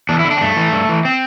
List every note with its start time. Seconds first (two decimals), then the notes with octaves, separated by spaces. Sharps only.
0.09 E2 D4
0.19 E4
0.24 D3
0.31 D4
0.37 C4
0.41 G2 A3
0.57 E3
0.72 G2
0.89 E3
1.05 C4